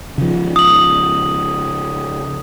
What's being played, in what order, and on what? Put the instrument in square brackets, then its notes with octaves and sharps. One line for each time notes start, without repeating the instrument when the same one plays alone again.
[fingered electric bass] C#3 F3
[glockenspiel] D#6 F#7